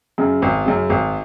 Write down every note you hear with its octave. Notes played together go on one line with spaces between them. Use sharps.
F#2 C#3
G#1
F#2 C#3
G#1